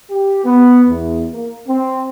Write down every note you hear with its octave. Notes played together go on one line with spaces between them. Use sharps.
G4
B3
E2
A#3
C4